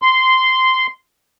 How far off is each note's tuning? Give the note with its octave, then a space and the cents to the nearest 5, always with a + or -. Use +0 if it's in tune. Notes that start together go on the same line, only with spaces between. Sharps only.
C6 -10